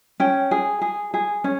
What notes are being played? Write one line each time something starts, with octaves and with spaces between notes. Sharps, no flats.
C#4 G5
G#4
G#4
G#4
C#4